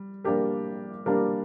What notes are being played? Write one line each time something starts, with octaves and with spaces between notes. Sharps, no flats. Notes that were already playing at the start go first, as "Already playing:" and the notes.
Already playing: G3
G3 A#3 D4 G4 A#4
G3 A#3 D4 G4 A#4